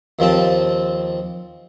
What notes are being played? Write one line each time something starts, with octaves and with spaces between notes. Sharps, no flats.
D#2 F3 C4 A5